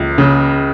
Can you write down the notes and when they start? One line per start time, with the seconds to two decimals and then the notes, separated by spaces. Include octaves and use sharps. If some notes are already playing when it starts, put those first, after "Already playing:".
Already playing: C#2
0.18 C#3